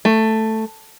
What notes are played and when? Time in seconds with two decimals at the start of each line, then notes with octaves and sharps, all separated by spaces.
0.05 A3